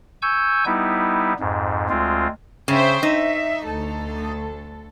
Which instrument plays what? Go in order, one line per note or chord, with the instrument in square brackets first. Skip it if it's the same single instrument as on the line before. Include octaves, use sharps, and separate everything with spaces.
[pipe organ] G#5 C#6 E6 G6
G3 B3 D#4 E4
F2 G#2
D2 G#3 C4 F4
[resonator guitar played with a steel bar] C#3 [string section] C5 E5 G5
[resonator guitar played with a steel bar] D#4 [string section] E5
[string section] D2 A4